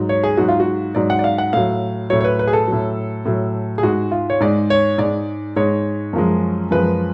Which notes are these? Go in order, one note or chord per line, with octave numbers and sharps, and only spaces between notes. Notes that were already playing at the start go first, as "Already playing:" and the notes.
Already playing: G#2 F#3
C#5
G#4
G#2 F#3 F#4
F4
F#4
G#2 F#3 D5
F#5
D5
F5
F#5
A2 F#3 F5
A2 F#3 C#5
C#5
B4
B4
G#4
A4
A2 F#3
A2 F#3
G#4
G#2 G#3 F#4
F4
C#5
G#2 G#3 D5
C#5
G#2 G#3 D5
G#2 G#3 C#5
F#2 F3 G#3
F#2 F3 G#3 B4